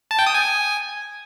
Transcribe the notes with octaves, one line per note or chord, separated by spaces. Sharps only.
A5
G5
D#6
G#5